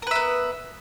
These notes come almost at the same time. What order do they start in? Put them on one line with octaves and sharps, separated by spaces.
A#4 B4 E5 B3